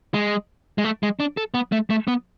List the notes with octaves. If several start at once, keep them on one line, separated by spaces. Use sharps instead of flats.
G#3
G#3
A3
G#3
D4
A4
B3
A3
A3
B3